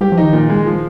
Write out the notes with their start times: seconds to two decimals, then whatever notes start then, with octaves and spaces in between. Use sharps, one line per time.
0.01 G3 G4
0.12 F3
0.18 D#3 D#4
0.33 A#2
0.50 G#3
0.66 F3